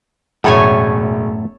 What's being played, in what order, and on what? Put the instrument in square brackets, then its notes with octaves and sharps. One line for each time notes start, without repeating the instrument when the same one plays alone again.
[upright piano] E1 [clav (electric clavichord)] F#2 A2 [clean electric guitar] A3 E5 [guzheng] A4 C#5 G#5